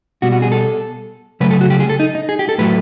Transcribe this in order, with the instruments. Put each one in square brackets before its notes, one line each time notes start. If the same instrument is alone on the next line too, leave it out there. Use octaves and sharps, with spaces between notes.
[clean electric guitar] B2 G3 F#4
F#4
G#4
A4
C#3 F#3 A3 B4
A4
F#4
G4
G#4
A4
D#4
D#4
G#4
G4
A4
A2 F#3 A3 B4